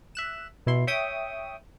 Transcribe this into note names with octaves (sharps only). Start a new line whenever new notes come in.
E5 F#6 E7
B2 E4 C6
C#5 E5 G5 C#6 D#6